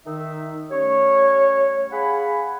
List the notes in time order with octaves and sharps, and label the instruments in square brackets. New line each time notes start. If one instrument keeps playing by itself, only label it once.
[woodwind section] D#3 D#4 E5
G3 A3 C#4 C#5
G#4 F5 F#5 G#5 B5